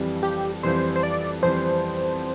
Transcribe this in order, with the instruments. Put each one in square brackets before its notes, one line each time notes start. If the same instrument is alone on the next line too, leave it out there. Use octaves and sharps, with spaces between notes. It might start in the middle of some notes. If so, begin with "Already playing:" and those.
Already playing: [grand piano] F2 E3 G3
[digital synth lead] G4
[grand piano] F2 E3 G3 [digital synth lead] C5
[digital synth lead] C5
D5
[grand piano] F2 E3 G3 [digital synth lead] C5